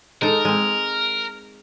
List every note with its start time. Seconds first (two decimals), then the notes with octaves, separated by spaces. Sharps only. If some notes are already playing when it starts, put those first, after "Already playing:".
0.22 G#3 D#4 A4 A#4
0.45 G#3 C4